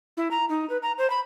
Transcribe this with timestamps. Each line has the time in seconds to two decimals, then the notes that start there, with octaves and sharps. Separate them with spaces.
0.17 E4
0.31 A#5
0.49 D#4
0.69 B4
0.82 A#5
0.98 C5
1.10 B5